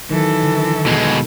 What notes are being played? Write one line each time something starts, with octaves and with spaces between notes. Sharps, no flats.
D#3 E3 F#3 A4
D3
B2 G#3